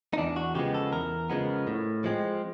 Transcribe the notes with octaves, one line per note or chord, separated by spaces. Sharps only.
D#4
E2 D4
F#4
C#3 F3 G#3 B3 G4
A4
E2 A#4
C#3 F3 G#3 B3
A2
F3 G#3 C4